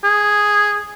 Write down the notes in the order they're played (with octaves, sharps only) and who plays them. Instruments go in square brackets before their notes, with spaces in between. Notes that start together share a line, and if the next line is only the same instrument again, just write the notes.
[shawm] G#4